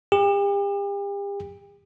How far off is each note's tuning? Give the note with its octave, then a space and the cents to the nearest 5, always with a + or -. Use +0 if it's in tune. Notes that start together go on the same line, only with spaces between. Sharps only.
G4 +40